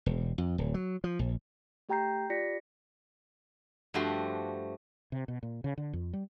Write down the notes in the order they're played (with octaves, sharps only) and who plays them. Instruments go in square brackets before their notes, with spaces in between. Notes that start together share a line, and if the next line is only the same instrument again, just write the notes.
[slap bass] E1
F2
D1
F#3
F3
A#1
[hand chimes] A3 G4 G5 A#5 G6 C7
F4 G4 D5 A#6 B6 C#7
[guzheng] G2 F3 A3 F#4 G4 C6
[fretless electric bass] C3
B2
A#2
C#3
D3
F2
G3